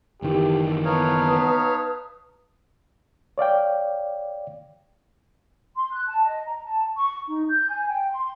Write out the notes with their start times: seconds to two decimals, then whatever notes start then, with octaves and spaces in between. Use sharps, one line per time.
0.22 F#1 D#3 E3 G4
0.85 B3 D#4 B4 C#5 F5 A5 D#6
3.38 C#5 D5 F5 G5
5.76 C6
5.92 F#6
6.06 A5
6.24 D#5
6.46 A#5
6.64 A5
6.97 C#6
7.27 D#4
7.49 G6
7.69 G#5
7.90 G5
8.11 C6